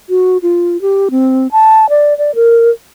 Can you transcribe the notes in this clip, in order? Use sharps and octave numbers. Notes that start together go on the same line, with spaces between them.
F#4
F4
G4
C4
A5
D5
D5
A#4